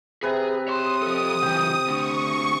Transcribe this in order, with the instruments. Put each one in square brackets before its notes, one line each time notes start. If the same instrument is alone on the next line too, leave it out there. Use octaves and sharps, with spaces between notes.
[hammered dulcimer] C3 B4 A#5 [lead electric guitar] G#4
[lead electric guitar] C#5 C6 [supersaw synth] D#6
[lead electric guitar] F3 A4
[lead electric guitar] C#3 E3 [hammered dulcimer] G5
[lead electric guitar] D2 D3 [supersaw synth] C#6